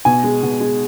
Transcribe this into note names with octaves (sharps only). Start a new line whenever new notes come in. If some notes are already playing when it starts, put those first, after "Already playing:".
B2 G#5
G#3
B2
G#3